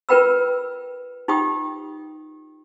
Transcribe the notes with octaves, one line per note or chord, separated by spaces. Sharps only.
F4 A#4 B4 G5 B5 E6
D#4 F4 G4 G5 D#6